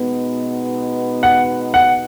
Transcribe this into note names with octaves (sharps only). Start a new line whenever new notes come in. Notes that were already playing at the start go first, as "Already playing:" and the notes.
Already playing: B2 G#3 B3 D#4
F#5
F#5